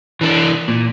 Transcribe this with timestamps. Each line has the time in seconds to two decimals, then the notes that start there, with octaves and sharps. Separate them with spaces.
0.21 E3 D4
0.68 A#2